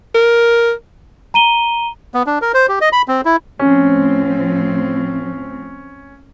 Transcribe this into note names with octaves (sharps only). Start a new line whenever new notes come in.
A#4
A#5 D#7 G7
B3
D4
A#4
C5
G4
D#5
B5
C4
E4
A2 F3 C4 C#4